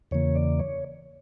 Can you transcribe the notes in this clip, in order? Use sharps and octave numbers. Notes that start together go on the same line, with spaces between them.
E2 C#3 E3 A#3 C#5
D5
C#5